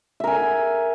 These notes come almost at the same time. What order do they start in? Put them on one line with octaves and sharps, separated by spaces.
E5 A#4 G#5